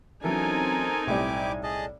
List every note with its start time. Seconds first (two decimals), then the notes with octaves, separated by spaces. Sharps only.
0.24 E3 F#3 C4 C#4 D#4 A4 A#4 G#5
1.07 B1 A2 G3 E4 G4 D5 D6
1.63 G#4 D#5 A5